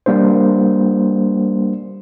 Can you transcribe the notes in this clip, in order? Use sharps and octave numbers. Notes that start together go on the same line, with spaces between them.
G3 A#3 D4 C5